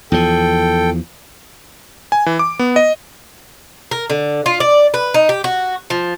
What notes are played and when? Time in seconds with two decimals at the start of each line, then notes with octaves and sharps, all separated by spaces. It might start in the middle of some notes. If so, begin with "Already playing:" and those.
0.12 E2 F3 A4 G5
2.12 G#5
2.26 E3
2.39 D6
2.59 B3
2.76 D#5
3.91 A#4
4.10 D3
4.46 F4
4.60 D5
4.94 B4
5.14 D#4
5.29 G4
5.44 F#4
5.90 F3